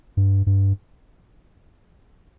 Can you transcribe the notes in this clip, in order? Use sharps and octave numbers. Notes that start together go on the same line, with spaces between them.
G2
G2